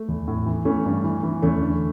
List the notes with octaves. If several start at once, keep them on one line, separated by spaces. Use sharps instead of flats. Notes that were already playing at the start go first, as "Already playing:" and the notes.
Already playing: A3
E2
A2
E3
E3 A3 C#4
G2
E3
E3
E2 A3 C#4
D3